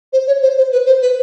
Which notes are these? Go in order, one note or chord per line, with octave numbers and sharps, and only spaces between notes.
C5
C#5
C5
C5
B4
C5
B4